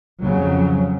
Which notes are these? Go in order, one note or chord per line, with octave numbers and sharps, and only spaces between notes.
F2 C#3 F#3